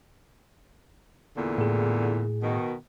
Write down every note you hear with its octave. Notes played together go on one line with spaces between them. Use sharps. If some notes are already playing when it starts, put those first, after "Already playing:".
E2 A#2 D3
A2 G#4
B2 D#3